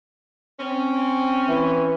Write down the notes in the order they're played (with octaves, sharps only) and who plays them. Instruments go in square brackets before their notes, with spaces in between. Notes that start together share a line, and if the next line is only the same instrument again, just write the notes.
[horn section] C4 C#4
[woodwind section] E3